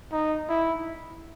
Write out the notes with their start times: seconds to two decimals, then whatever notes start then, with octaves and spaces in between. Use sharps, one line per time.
0.13 D#4
0.49 E4